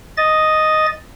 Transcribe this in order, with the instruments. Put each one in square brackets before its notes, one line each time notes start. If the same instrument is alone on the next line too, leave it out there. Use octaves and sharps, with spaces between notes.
[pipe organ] D#5 A6